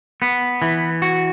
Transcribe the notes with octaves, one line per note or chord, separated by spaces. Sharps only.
B3
E3
F#4